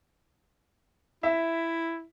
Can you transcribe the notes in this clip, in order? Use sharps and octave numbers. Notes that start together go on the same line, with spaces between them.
E4 E5